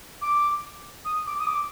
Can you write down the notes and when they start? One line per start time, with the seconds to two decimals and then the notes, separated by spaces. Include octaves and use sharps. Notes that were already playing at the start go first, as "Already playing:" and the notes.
0.22 D6
1.05 D#6
1.27 D6
1.39 D#6
1.47 D6